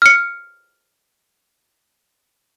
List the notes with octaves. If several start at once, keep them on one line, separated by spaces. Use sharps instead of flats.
F6 C#7